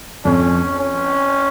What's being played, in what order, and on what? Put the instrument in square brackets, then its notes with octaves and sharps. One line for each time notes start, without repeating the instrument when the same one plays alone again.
[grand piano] F2 [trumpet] C#4
[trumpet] C#4